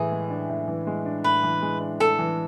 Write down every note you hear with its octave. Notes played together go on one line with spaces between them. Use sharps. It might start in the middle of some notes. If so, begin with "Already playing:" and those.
Already playing: A2 E3 G#4
G#3
D4
A2
E3
G#3
D4
A2 B4
E3
G#3
D4
A2 A4
E3